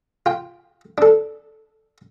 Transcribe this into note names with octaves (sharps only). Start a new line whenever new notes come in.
F4 G5
D4 A4